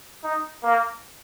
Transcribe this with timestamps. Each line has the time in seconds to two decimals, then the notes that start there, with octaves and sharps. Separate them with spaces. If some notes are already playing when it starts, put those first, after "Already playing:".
0.24 D#4
0.63 A#3